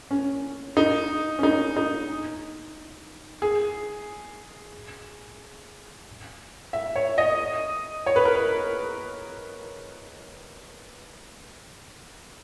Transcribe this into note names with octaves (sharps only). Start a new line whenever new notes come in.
C#4
D#4
C#4
D#4
D#4
G#4
E5
C#5
D#5
C#5
B4
A#4
B4